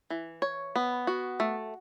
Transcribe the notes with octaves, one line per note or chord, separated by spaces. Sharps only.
E3
C#5
B3
F#4
A3